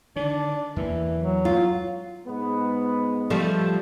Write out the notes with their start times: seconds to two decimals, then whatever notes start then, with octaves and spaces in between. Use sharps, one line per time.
0.16 D3 D#3 D4
0.76 E2 E3 A#3
1.18 F#3
1.45 F4
2.28 G#2 G#3 B3
3.30 F3 G3 A3